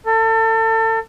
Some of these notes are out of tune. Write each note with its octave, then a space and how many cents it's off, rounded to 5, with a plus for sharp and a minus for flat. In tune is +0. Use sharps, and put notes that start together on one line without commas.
A4 +30